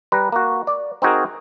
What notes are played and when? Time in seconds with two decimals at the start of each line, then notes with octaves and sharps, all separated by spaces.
0.12 G3 B4 A#5
0.32 A#3 F#4
0.67 D5
1.02 C4 D#4 F#4 G#4 A#4